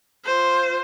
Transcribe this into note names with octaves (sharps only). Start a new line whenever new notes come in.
F4 C5